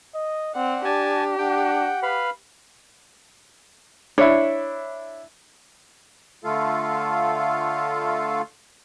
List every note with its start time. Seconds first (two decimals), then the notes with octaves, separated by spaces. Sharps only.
0.15 D#5
0.54 C4 D5 F#5
0.85 D4 G4 G#5 A5
1.38 D4 F#5 G5
2.03 B4 F5 B5
4.18 D4 E4 C#5
6.44 D3 A3 F4 A4 F5